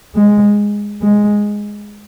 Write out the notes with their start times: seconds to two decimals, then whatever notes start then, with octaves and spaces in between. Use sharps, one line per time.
0.15 G#3
1.02 G#3